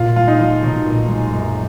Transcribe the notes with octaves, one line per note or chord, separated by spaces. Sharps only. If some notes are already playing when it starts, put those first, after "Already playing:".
Already playing: A#2 F4
G#3 F4
D#4
F3 F4
B1
A#2
G#3
F#2